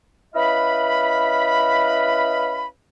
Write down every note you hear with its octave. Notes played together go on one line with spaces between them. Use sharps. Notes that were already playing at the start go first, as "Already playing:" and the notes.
C#4 E4 B4 D#5 F5 B5